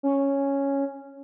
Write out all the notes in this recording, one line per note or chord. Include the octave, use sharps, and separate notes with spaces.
C#4